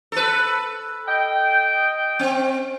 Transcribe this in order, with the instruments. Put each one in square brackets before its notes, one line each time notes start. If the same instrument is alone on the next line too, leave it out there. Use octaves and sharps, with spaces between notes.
[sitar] A4 B4
[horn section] D#5 G5
[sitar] C4